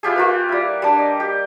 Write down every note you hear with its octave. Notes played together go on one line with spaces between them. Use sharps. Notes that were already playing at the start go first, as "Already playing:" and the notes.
E4 F4 G4 G#4
A#3 F4 B4
G3 E4
G3 D4
D#5
G4